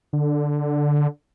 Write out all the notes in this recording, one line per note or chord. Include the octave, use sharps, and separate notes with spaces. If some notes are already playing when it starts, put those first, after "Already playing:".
D3